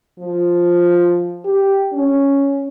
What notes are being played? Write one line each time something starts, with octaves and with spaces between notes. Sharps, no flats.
F3
G4
C#4